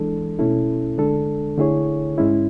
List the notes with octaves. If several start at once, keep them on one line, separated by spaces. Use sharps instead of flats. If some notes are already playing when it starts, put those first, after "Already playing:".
Already playing: E3 G#3 D4 A4
B2 A3 C#4 E4 A4
D3 G#3 D4 A4
D3 A3 E4 G#4 C#5
G#2 G#3 C#4 E4